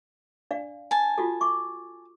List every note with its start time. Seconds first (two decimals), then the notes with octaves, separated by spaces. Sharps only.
0.51 D4 D5 F5
0.91 G#5 A5
1.18 F4 F#4 A4
1.41 C#6 D6